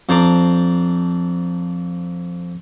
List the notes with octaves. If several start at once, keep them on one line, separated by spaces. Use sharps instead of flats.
F2 D4 C5 A5 A#5 D6